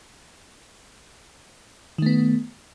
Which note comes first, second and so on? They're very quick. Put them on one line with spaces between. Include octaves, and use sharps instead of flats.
D#3 A3 B3